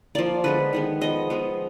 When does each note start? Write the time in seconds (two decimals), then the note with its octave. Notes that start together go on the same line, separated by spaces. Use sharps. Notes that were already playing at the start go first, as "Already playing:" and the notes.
0.15 F3 A#3 D5
0.44 D3 G#3 B3 B4
0.73 D#3 G#3 B3
1.01 F3 B3 D#5
1.30 F3 G#3 B3